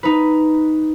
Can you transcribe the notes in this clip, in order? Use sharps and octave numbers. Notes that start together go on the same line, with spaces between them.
D#4 B4